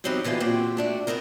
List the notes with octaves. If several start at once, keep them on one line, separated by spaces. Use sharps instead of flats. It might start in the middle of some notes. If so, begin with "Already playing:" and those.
E2 F#3 C4 D#4 G4 B4
B2 D3 E3 F4 G4
A#2 C4 F#4 G4
A3 D4 F#4
B3 C4 D#4 A4 A#4